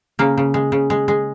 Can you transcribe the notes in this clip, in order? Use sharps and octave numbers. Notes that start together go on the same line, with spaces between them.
C#3 A#3
C#3
G#3
C#3
G#3
G#3